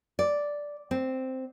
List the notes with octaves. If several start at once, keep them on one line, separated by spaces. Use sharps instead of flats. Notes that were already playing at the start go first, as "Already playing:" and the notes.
D5
C4